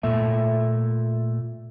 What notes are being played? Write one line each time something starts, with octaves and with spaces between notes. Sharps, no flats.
A#2 A3 A#3 A4 E5